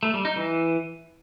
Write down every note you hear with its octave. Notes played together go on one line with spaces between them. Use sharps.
A3
G3
D#4
E3